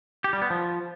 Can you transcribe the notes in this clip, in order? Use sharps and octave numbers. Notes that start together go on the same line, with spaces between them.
G4
G3
B3
F3